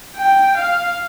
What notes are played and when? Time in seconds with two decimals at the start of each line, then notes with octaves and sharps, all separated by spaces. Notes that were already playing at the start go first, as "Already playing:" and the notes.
0.17 G5
0.58 F5